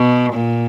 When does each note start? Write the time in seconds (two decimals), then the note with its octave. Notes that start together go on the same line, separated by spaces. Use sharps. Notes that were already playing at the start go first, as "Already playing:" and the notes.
Already playing: B2
0.33 A#2